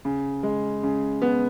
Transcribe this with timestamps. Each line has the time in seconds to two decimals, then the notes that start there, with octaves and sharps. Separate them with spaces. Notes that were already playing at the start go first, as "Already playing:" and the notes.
0.05 C#3
0.43 G#3
0.83 C#3
1.22 B3